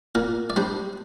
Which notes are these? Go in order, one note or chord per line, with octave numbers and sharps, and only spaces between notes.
A#2 A#4
D5
G3 D4 C5